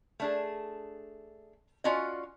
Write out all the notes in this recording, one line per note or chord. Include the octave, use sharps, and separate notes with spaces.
A3 D4 G#4
C#4 F4 F#4 D5 D#5